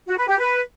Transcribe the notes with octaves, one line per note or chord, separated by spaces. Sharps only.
F#4
B4
G4
B4